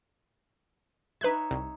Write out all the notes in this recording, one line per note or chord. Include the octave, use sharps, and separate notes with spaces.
D#4 B4 C#5 E5 F#6 G#6
C2